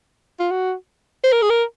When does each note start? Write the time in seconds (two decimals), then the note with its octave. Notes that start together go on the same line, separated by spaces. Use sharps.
0.39 F4
0.51 F#4
1.24 C5
1.32 A#4
1.42 G#4
1.50 A#4